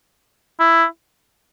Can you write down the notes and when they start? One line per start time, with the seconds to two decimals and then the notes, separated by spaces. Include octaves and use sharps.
0.60 E4